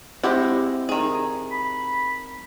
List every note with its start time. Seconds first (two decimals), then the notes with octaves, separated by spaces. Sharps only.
0.24 G#3 C4 E4 G4 F#5
0.89 D#3 G#4
1.51 B5